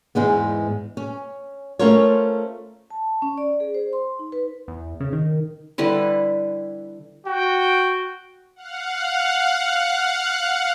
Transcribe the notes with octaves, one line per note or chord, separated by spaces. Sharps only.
E2 G#2 G#3 B3
C#4
A3 C#4 F4 A#4 C5 C#5
A5
C#4
D5
G#4
C5
C6
D#4
B4
E2
C#3
D#3
D3 G3 E4 B4
F#4 G5
F5 F#5